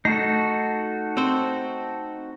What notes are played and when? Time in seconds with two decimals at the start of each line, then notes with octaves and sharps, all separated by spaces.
0.05 A3 D#4 F#4 A4
1.17 C4 C5